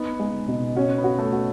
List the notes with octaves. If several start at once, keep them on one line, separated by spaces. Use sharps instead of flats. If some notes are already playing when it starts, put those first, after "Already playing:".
Already playing: B3 D#4
G#3
B2
C#4 F#4
B3
F#4
A3
F#4